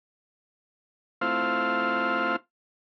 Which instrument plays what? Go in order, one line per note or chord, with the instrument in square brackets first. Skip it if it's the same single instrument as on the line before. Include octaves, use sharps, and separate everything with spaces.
[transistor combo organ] A3 C4 E4 F4 C5 F5